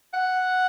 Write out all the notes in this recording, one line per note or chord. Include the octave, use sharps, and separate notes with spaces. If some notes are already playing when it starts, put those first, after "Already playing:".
F#5